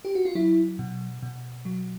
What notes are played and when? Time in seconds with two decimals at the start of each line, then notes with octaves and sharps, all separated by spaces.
0.05 G4
0.15 F#4
0.25 F4
0.35 F#3 E4
0.79 B2
1.23 B2
1.65 F#3